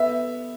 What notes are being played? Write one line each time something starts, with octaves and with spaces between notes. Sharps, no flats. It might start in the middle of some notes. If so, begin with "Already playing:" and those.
Already playing: B3 E5